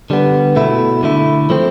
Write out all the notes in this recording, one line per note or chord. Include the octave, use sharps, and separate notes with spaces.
D3 G3 B3
B2 A3 E4
D3 A3 E4
F3 A3 C4